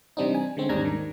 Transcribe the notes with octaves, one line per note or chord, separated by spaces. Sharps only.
C3 E3 G3 C4 D4 D#4
G#5
D3 G#3 C4 C#4
D#2 G#2 G3 D4 A#5 G#6
D#3